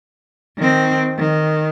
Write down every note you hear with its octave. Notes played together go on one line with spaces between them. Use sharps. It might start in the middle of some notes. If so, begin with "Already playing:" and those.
D#3 C4
D#3